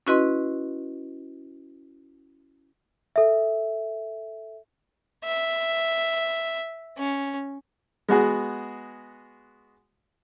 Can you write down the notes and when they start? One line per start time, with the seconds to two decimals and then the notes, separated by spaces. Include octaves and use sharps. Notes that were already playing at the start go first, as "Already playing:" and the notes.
0.07 C#4 E4 F#4 B4 D#5 C6
3.16 A4 E5
5.24 E5
6.98 C#4
8.08 G#3 B3 F#4 G#4